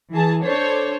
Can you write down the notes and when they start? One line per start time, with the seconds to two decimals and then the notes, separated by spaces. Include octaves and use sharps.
0.12 E3 G#4 A5
0.44 D4 A4 C5 C#5